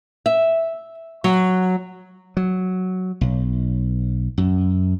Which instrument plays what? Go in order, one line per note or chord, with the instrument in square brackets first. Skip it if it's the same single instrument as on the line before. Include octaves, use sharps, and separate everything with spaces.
[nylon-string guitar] E5
F#3
[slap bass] F#3
B1
F#2